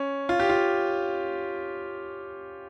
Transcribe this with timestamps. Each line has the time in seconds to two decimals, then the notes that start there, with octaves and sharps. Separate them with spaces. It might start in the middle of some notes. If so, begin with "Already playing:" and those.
Already playing: C#4
0.29 F4
0.40 G4
0.49 F4